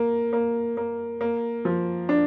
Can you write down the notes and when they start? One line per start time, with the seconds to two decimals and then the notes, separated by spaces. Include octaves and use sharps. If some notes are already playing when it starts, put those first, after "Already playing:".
Already playing: A#3
0.33 A#3
0.77 A#3
1.21 A#3
1.65 F3
2.09 D4